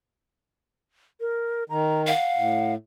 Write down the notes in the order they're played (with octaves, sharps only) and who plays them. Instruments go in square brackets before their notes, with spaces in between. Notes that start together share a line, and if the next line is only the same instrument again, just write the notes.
[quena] A#4
[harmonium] D#3 [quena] A#5
[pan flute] F5 [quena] F#5
[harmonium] A2